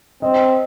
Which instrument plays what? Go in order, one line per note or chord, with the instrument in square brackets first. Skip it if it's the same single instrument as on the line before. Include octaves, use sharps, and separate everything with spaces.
[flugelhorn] C4 [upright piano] D#5